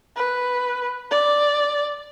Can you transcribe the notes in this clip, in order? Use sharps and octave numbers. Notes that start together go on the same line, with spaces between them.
B4
D5